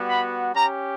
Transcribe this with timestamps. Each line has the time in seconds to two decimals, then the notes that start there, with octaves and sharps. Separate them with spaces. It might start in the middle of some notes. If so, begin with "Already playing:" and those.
Already playing: G3 B3 F#4
0.08 B5
0.55 C#4 G4 A#5